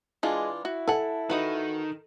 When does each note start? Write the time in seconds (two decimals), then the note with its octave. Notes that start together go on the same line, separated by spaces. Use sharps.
0.23 E3 G#3 D4 F4
0.65 E4 F#4
0.88 A4 F#5 G#5
1.30 D#3 D#4 F#4 B4